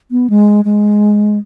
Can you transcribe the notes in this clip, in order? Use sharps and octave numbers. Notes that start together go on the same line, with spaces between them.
B3
G#3
G#3